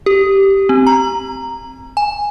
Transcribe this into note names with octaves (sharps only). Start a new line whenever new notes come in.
G4
C4
A#5
G#5